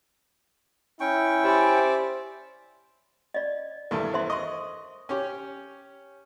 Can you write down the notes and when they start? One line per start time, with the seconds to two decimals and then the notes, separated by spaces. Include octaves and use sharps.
1.00 C#4 E4 G5 C#6
1.44 G4 C5 D5 E5 G#5 B5
3.34 D5 D#5
3.91 E2 G2 A3 A#4
4.14 C5 E5 C6
4.30 D#5 C6 C#6
5.09 C#4 G4 C#5